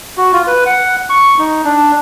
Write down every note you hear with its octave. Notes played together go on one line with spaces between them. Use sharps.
F#4
F4
B4
F#5
C#6
D#4
D4